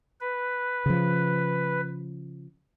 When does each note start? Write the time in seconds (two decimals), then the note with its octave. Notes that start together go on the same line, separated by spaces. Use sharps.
0.20 B4
0.86 C#3 F3